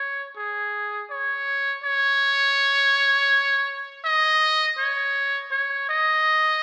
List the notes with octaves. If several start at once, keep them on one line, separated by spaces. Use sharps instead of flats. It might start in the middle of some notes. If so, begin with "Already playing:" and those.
Already playing: C#5
G#4
C#5
C#5
D#5
C#5
C#5
D#5